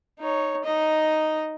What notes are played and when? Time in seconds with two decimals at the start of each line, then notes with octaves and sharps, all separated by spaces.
0.20 D#4 C#5
0.64 D#4 D#5